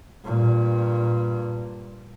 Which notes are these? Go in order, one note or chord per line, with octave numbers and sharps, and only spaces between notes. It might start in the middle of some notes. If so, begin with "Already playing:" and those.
G2 A#2